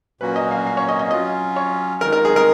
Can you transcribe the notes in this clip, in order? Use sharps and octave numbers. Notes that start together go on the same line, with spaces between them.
A#2 F#3 A#3 C#4 F#4 B4
D#5
F5
F5
C#5
D#5
D#5
F#3 C#4 F4 D#5
C#5
D#3 G#3 D#4 A#4
A#4
G#4
A#4